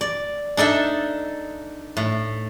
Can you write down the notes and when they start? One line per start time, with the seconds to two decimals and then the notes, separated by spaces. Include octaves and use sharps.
0.01 D5
0.57 D4 D#4 A4 E5
1.97 A2